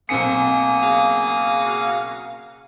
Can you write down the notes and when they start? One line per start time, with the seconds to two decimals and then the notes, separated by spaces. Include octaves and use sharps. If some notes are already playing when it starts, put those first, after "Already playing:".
0.09 B1 A#3 C4 G#5 D#6 C#7
0.81 C#3 F#4 F5